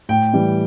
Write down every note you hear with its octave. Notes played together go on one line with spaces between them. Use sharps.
A2 G5
E3 G3